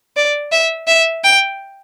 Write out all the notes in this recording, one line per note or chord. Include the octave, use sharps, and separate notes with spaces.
D5
E5
E5
G5